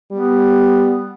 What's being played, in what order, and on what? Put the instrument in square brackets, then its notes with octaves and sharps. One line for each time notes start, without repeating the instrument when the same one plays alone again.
[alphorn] G3 [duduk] B3